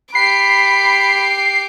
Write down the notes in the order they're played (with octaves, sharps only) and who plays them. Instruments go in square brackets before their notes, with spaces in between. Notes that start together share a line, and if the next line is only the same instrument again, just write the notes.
[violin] G4 D6 [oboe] B5 [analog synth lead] C7